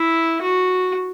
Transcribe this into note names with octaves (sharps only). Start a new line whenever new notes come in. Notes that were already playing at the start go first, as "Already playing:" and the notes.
Already playing: E4
F#4